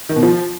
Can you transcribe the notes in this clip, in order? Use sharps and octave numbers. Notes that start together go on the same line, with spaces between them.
D#3
B2
F3